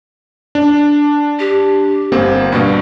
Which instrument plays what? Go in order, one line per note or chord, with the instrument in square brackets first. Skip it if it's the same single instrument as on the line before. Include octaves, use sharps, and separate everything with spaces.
[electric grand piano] D4
[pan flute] G4
[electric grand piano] G1 A#3 C4
[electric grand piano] G2 B2 [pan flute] A#3